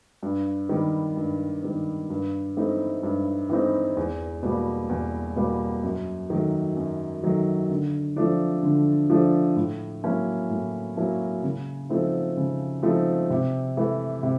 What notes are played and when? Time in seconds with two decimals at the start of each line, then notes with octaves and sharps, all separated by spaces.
0.23 G2
0.69 D#3 G3 B3
1.17 G2
1.63 D#3 G3 B3
2.10 G2
2.57 E3 A3 C4 D#4
3.03 G2
3.50 E3 A3 C4 D#4
3.97 E2
4.43 B2 G3 A#3
4.89 E2
5.36 B2 G3 A#3
5.83 F#2
6.30 D#3 F#3 A3
6.76 F#2
7.23 D#3 F#3 A3
7.70 D3
8.16 F3 A3 D4
8.63 D3
9.10 F3 A3 D4
9.56 A2
10.03 F#3 A#3 C#4 E4
10.50 A2
10.97 F#3 A#3 C#4 E4
11.43 C#3
11.89 F3 A3 C4 D#4
12.37 C#3
12.83 F3 A3 C4 D#4
13.30 C3
13.77 E3 A3
14.23 C3